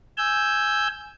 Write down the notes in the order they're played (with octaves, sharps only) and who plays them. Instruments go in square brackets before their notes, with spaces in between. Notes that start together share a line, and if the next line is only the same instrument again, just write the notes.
[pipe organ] G#5 E6 G6